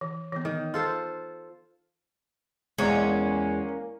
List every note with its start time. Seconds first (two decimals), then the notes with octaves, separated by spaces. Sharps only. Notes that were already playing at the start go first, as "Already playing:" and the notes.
0.01 E3
0.33 E3 B3
0.45 D#3
0.74 F4 A4 C5
2.78 E2 G#3 A#3 C#4